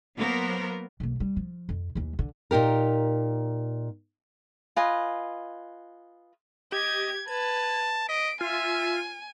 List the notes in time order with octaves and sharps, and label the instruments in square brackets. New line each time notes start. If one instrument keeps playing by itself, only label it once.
[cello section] F#3 A#3 B3 A#4 C5
[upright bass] B1 A#3
G3
F3
F2
D#2 E3
D3
[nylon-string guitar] A#2 D#4 G4 A#4
[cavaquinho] F4 B4 D#5 G#5
[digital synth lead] G4 [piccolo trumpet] D#5 [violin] G#6
[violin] B4 [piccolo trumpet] A5 [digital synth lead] G#6
[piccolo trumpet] D#5 [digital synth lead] B6 [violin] D7
[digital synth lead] F4 [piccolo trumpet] E5 [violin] G#5